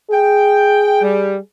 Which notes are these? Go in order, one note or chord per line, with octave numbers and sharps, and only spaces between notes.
G#4 G5
G3